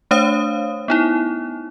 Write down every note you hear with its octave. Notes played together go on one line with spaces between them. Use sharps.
A3 D4 C5 C#5 F5 D#6
B3 D#4 E4